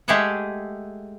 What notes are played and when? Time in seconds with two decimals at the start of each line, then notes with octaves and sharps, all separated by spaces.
0.08 G#3 A3 G4 G#4 E5 F#5